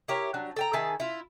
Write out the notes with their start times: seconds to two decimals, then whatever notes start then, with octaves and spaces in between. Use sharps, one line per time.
0.08 E4 G4 A#4 C#5
0.34 F#3 G3 D4
0.56 A4 G5 A#5
0.73 D#3 G#4 E5 A5
1.00 E4 F4